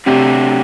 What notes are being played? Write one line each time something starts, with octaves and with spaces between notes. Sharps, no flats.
C3 F#3 A3 D4 G4